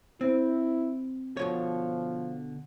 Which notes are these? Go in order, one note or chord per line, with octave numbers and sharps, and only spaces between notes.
C4 E4
B2 D3 F3 C#5